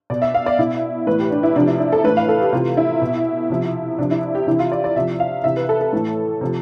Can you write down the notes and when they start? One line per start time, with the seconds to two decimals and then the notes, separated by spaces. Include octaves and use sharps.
0.10 B2 D5
0.22 E5
0.34 F5
0.46 D5
0.58 B2 E4
1.07 A2 E3 B4
1.20 G4
1.31 D4
1.43 E4
1.56 C3 F3 D4
1.67 E4
1.80 E4
1.92 A4
2.04 A2 B4
2.08 E3
2.17 F5
2.29 A4
2.41 G4
2.53 C3 E3 F4
2.77 E4
3.01 B2
3.50 C3 F3
3.98 C3 F3 D4
4.11 E4
4.35 G4
4.47 C3 E3 E4
4.59 F4
4.72 D5
4.84 D5
4.96 C3 F3 E5
5.20 F5
5.44 C3 E3 E5
5.57 B4
5.69 A4
5.81 A4
5.93 A2 E3
6.41 C3 F3